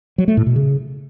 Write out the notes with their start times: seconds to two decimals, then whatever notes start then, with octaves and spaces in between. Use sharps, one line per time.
0.18 F#3
0.28 A3
0.37 A2
0.46 B2
0.56 C#3